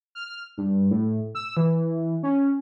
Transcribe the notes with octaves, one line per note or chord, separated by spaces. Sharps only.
F6
G2
A2
E6
E3
C#4